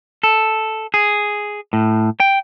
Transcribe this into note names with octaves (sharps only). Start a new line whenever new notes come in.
A4
G#4
A2
G5